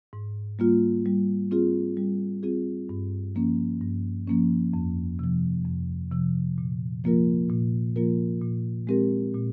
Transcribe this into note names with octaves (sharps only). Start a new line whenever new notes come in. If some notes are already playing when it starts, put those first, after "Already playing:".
G#2
G3 A#3 F4
G3
C4 F4 G#4
G3
C4 F4 G#4
G2
F3 A#3 C#4
G2
F3 A#3 C#4
F2
C3 F3
F2
C3 F3
A#2
F3 A#3 F4 A#4
A#2
F3 A#3 F4 A#4
A#2
G#3 C4 G4 A#4
A#2